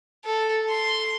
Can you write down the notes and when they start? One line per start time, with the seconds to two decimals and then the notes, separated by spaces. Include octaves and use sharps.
0.25 A4
0.70 C6